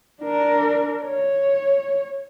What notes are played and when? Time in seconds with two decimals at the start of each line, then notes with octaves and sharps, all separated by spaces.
0.22 D4 A#4
1.05 C#5